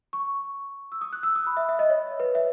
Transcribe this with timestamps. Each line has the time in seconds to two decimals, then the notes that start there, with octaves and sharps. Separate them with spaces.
0.13 C#6
0.92 E6
1.01 D#6
1.13 F#6
1.23 E6
1.35 D#6
1.47 B5
1.57 E5
1.69 E5
1.79 D#5
1.90 C#5
2.20 B4
2.35 E5